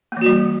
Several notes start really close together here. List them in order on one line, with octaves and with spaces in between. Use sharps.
A#3 E3 F#4 G3